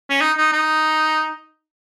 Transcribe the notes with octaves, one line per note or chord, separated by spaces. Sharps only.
C#4
D#4
D#4
D#4